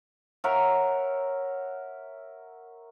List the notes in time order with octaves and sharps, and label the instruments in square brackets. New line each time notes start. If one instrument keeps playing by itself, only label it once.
[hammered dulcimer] A#4 C#5 E5 F#5